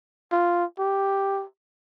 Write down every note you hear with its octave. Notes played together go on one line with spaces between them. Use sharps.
F4
G4